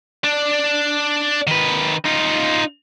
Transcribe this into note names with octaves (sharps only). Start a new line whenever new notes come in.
D4
D#3 B4
D#4 F4